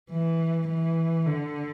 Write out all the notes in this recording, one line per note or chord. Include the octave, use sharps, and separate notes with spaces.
E3
E3
D3